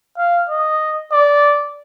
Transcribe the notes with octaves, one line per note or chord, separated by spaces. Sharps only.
F5
D#5
D5